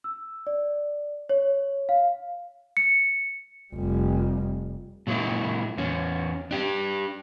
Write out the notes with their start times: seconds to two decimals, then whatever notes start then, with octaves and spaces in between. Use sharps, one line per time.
0.04 E6
0.47 D5
1.29 C#5
1.89 F5
2.77 C#7
3.74 F1 G3
5.07 A#2 F#3 G#3 A#3 E4
5.77 E2 C#4
6.51 D4 G4